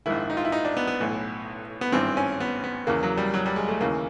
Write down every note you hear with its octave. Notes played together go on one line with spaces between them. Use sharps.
A#1 G#2 D#3 E4
D#4
F4
E4
D#4
D4
B3
B3
B1 A2 E3
B3
G#1 G2 E3 C4
C#4
B3
B3
E2 C#3 E3 A#3
F#3
G3
F#3
G3
G#3
A3
D#2 C#3 E3 A#3